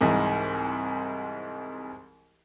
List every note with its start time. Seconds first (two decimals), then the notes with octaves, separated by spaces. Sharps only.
0.01 C2 G#2 E3